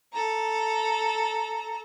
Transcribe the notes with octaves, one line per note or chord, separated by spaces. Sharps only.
A4 A#5